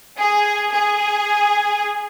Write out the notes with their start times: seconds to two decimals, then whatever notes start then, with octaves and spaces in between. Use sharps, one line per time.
0.18 G#4
0.72 G#4